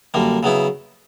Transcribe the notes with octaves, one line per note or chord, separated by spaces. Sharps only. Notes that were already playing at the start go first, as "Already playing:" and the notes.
F#2 D3 G3 A#3
C#3 F#3 B3 E4